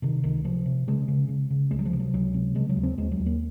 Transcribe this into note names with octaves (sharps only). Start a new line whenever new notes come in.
C3 D#3
C#2 D#3
C3 F3
C3
C#3 G#3
C#3
C#3
C#3
C#2 G#3
F#3
F3
C3
F#3
C#2 F#3
C3
C#3 G#3
F#3
D#2
C4
D#2 G#3
F#3
D#2
A#3